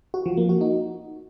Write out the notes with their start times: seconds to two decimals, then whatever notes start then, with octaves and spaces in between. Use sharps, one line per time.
0.14 F#4
0.26 F3
0.37 A#3
0.49 F#4
0.61 D#4